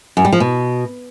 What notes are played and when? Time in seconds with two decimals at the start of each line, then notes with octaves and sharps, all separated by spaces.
0.17 F#2
0.25 G3
0.33 F3
0.40 B2